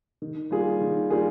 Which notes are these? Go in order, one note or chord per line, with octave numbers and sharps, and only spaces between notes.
D#3
G3 A#3 F4 G#4
D#3
G3 A#3 F4 G#4